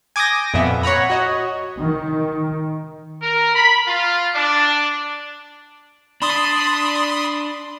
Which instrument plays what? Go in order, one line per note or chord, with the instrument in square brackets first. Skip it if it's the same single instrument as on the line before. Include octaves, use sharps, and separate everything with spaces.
[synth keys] G#5 D6 D#6 G6 A#6
F2 A#2 B3 E5
C#5 F#5 A#5 B5
F#4 C#5 D#5
[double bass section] D#3
[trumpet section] A#4
B5
F4
D4
[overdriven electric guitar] D4 [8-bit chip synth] B5 C6 D#6